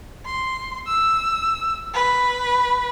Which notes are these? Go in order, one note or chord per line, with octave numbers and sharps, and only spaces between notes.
C6
E6
B4